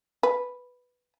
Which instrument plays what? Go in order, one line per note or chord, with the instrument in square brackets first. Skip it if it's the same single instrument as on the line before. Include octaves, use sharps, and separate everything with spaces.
[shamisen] B4